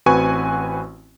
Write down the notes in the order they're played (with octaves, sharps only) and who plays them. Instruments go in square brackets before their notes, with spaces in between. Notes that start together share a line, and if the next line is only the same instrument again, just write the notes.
[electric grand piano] A1 C4 F#4 B4 G#5 C#6